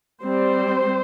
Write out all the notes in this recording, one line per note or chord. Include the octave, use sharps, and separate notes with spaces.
G3 C4 C5